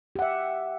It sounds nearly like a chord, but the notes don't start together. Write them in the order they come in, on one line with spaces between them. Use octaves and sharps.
G4 F#5 E5